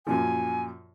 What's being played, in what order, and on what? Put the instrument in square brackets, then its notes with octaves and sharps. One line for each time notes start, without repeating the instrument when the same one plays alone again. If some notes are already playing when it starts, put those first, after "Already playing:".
[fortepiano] F#2 A#2 F3 [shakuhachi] G#5